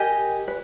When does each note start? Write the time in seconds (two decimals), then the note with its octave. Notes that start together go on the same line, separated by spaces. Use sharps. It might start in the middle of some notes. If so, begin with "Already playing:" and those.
Already playing: G4 A#4 D#5 G#5
0.48 B4